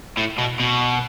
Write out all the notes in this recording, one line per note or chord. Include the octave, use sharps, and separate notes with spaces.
A2
B2
B2